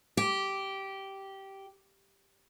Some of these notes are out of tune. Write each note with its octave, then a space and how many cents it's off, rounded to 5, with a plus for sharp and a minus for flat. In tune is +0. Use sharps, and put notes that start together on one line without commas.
G4 -10